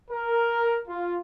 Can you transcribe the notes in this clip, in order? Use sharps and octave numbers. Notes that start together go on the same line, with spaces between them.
A#4
F4